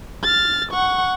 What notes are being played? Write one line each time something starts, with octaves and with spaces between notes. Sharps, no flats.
F6 A6
F#5 C#6